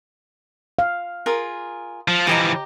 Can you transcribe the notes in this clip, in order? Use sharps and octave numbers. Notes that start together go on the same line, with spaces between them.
F5
F4 G#4 A#4
F3
E3 F3 G4 D#5 A#5